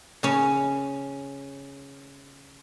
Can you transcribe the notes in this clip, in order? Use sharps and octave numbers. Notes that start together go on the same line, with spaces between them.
C#3 C#4